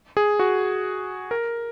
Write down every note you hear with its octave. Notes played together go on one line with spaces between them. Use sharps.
G#4
F#4
A#4